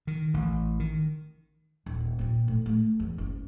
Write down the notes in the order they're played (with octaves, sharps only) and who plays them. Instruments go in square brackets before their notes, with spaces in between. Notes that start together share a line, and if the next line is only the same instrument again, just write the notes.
[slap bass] D#3
A1
D#3
[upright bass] D#1
A#2 C4
A2
A3
E2
F#1